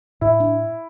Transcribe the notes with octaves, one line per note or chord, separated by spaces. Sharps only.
A2 E4
D4